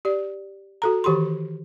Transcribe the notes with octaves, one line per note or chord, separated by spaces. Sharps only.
G4 D5
F#4 A4 A#5
D#3 E3 G4 B5 C6